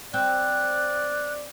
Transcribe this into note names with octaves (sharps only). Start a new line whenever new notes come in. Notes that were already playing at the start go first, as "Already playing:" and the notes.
C4 D5 F#6